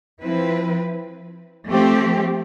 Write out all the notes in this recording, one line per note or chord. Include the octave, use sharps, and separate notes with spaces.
F3 C4 E4 B4
F3 A3 C4 G4